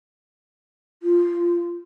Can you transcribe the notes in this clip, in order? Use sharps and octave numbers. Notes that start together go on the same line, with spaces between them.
F4